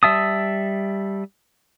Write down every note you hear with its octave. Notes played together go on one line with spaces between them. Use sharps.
G3 E5 A5 D#6